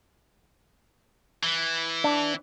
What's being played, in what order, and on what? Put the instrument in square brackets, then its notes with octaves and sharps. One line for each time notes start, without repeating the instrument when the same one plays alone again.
[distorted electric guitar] E3
[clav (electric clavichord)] D4